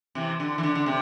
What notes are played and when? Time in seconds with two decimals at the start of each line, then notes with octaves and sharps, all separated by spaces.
0.15 C3 E3
0.40 D3
0.58 E3
0.63 D3
0.75 D3
0.86 C3